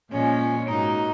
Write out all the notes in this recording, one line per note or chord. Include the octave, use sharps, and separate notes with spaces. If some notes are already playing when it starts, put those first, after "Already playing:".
A#2 F3 G#3 C#4
G#2 F#3 A#3 D#4